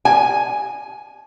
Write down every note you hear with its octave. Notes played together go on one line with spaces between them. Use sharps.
G#5